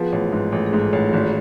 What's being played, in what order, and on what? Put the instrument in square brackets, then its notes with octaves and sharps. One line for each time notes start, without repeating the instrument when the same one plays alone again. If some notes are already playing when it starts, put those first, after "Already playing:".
Already playing: [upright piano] F3 B3 [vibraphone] G#4 B4
[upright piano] A1
G#2
[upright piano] A1 [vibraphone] A4
[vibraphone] G#4
[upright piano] G#2
[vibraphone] F4 A4
[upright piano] A1
G#1